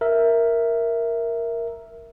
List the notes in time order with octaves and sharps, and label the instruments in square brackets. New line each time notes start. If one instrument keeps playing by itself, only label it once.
[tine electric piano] A#4 E5